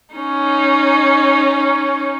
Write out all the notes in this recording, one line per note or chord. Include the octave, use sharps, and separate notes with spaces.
C#4 D#4